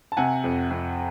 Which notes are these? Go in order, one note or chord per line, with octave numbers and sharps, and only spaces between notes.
A5
C3 F#5 G#5
F2
F2